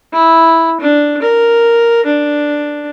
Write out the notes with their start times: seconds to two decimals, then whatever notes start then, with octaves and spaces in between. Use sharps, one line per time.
0.13 E4
0.81 D4
1.22 A#4
2.06 D4